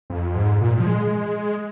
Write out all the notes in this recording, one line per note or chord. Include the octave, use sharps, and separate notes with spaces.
F2
G#2
A#2
F3
G#3